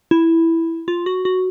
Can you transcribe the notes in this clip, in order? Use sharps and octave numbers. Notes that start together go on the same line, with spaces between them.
E4
F4
F#4
F#4